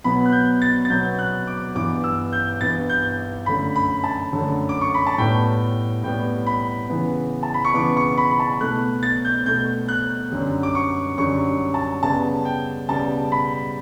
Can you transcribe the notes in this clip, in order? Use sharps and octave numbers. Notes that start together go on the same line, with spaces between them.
B2 F#3 B3 B5
F#6
G6
A6
A6
B2 F#3 B3 G6
F#6
D6
G2 E3 B3 D6
E6
G6
G2 E3 B3 A6
G6
F#2 D3 A3 B5
B5
A5
F#2 D3 A3
D6
C#6
B5
A5
A2 G3 B3 G5
A2 G3 B3 G5
B5
C#3 E3 B3
A5
B5
C#6
C#3 E3 B3 D6
C#6
B5
B5
A5
B2 A3 F#6
A6
G6
B2 A3 G6
F#6
F#2 D3 G3
D6
C#6
F#2 D3 G3 C#6
A5
C#3 G3 B3 A5
G5
C#3 G3 B3 A5
B5